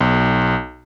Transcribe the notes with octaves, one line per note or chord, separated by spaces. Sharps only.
B1